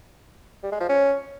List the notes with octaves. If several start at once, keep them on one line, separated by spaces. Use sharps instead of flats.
G3
G#3
F3
C#4